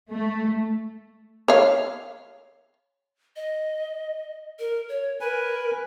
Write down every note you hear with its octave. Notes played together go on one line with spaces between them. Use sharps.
A3
C#5 F5
D#5
A#4
C#5
A#4 B4 G#5